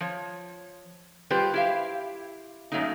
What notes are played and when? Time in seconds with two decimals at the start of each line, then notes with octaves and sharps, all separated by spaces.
0.01 F3 C#5
1.30 G3 F4 G4 B4 C5
1.53 E4 G4 F5
2.72 F#2 C#3 F#3 A3 A#3 D#4